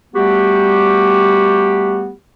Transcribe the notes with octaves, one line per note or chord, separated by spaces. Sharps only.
G3 A3 B3 F#4 G4